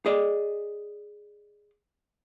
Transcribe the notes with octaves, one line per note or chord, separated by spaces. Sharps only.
G#4 D5 D#5